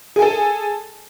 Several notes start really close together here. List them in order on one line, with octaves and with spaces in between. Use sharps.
G#4 G#5 A4